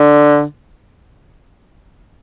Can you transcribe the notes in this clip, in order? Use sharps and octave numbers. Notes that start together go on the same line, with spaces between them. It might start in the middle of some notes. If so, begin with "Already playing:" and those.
Already playing: D3